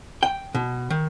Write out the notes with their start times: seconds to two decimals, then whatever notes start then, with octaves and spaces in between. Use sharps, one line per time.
0.23 G5
0.55 B2
0.90 D#3